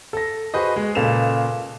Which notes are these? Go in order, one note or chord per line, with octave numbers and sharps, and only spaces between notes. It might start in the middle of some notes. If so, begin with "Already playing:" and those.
A4 A#6
F#4 G#4 B4 C5 D#5
G#3
A#2 C#3 A4 B4 E7 F7